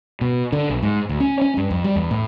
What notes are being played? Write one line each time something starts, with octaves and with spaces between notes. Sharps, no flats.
B2
D3
B1
G#2
D2
C#4
C#4
G2
F2
G3
E2
A2